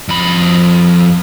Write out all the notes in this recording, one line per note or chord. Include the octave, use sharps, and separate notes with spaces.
F2 B5